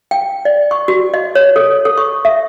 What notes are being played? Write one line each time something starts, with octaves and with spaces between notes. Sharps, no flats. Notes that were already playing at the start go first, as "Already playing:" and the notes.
G5
D5
C#6
F#4
D#5
C#5
A4
A4
C#6
E5